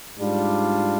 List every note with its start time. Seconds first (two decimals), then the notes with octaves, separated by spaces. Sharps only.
0.17 G#2 G3 D4 F4